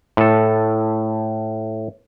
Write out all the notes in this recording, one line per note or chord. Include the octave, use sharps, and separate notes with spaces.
A2 A4